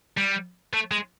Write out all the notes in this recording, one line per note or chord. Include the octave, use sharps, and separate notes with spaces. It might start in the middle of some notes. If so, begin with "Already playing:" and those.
G3
A3
G#3